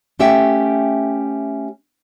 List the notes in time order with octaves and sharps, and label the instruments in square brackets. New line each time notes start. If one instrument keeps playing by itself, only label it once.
[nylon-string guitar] A3 C#4 G4 E5 F#5 G5